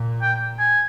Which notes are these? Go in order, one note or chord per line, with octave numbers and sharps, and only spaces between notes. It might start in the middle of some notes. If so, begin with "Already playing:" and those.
Already playing: A#2
G5
G#5